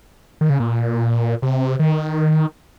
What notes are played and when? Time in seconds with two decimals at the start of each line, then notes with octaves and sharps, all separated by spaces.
0.41 D#3
0.50 C#3
0.60 A#2
1.42 C3
1.79 D#3